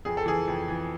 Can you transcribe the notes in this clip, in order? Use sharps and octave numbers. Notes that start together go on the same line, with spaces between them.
F2 G#4
A4
E3 G#4
F2
E3